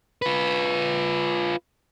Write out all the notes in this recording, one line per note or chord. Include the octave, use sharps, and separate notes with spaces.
F4 B4